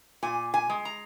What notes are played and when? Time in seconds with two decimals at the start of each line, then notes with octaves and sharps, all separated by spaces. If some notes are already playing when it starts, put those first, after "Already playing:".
0.23 A#2 G#5
0.54 G#5
0.70 G#3
0.85 A#5